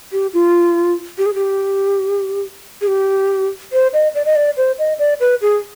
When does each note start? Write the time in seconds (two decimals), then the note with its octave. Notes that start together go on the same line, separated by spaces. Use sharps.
0.12 G4
0.34 F4
1.18 G4
1.26 G#4
1.34 G4
2.81 G#4
2.87 G4
3.73 C5
3.93 D#5
4.15 D5
4.25 D#5
4.36 D5
4.57 C5
4.79 D#5
4.99 D5
5.20 B4
5.41 G#4